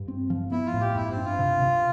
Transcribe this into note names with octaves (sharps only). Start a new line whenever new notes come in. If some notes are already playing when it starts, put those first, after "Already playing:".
Already playing: G2
C4
F3
B3 E4
F4
A2
G4
G2 E4
C4
D4
F4
C3
C3